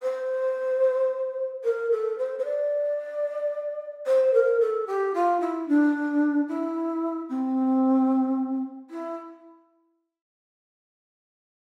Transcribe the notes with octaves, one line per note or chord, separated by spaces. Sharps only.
C5
A#4
A4
C5
C5
D5
C5
A#4
A4
G4
F4
E4
D4
E4
C4
E4